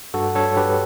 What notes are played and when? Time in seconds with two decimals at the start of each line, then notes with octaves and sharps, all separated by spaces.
0.14 G2 F#4 A4
0.35 G2 A4 C#5
0.57 G2 G4 B4